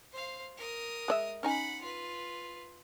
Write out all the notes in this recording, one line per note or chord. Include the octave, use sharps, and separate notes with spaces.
C5 F5
A#4 D#6
G#3 D5 E5
C#4 D#4 F#5 G#5 B5
F4 B4